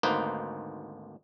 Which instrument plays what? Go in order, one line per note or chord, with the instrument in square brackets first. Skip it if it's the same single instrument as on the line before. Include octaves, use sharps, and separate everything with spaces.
[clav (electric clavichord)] G#1 D2 A#3 D#4 B4 C5